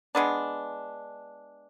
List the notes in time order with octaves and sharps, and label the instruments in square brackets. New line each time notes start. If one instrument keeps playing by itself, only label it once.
[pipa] G#3 B3 D4